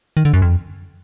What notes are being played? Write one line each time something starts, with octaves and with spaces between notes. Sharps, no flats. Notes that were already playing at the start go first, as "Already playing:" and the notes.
D#3
D3
F#2
F2